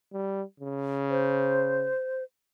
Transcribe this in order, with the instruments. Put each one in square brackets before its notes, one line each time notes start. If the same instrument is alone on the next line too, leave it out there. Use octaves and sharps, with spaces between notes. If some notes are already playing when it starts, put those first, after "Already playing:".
[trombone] G3
C#3
[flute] C5